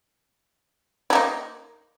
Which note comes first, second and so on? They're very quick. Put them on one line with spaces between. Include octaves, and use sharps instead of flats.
E4 A#3 D#4